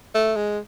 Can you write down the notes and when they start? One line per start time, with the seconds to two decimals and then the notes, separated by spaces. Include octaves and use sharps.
0.15 A3
0.36 G#3